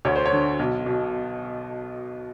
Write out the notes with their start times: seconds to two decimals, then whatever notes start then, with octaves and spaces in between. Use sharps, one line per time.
0.05 D2 C#5
0.16 C5
0.26 C#5
0.33 D3
0.59 B1
0.86 B2